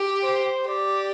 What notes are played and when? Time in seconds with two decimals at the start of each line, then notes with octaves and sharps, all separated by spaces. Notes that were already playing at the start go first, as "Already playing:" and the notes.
Already playing: G4
0.23 C5
0.68 G4 D5